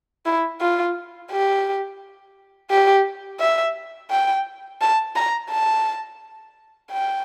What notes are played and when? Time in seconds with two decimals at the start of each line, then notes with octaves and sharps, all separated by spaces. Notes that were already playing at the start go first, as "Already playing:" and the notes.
0.26 E4
0.61 F4
1.31 G4
2.70 G4
3.40 E5
4.11 G5
4.81 A5
5.16 A#5
5.50 A5
6.91 G5